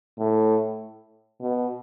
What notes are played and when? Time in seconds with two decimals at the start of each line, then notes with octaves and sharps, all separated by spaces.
0.18 A2
1.41 B2